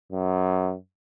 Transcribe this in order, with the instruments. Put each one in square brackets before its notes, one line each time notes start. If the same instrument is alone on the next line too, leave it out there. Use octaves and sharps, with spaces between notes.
[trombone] F#2